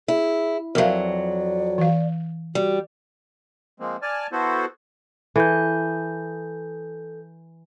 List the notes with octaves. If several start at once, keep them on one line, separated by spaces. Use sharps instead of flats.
E4 G#4
F2 F#3 A#4 D5 E5 F5
E3 F5
G3 F#4
F3 G#3 A#3 C4
D5 G#5 A5 F6
B3 E4 F#4 A4 C5
E3 A4 G6